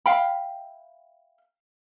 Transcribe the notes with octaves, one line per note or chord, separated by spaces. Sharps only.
E5 F5 G5 B5